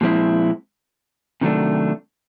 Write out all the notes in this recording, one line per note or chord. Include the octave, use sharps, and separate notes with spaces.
A#2 F3 G#3 C4 E4
C3 D#3 F#3 A3 D4